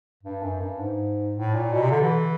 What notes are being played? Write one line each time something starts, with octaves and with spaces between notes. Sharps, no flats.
G2
F#2
G2
G#2
A2
A#2
B2
C3
D3
E3